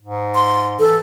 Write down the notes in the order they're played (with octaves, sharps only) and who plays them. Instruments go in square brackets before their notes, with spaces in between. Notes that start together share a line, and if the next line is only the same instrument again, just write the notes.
[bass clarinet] G#2
[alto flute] C6
[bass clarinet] E3 [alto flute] A4